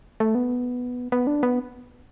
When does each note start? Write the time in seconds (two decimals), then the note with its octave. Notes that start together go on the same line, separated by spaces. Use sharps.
0.20 A3
0.35 B3
1.12 B3
1.27 D4
1.43 B3